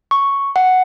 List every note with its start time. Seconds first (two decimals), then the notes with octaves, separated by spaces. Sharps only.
0.11 C#6
0.56 F#5